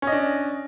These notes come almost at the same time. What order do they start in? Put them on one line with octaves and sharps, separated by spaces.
C#4 D#5 D4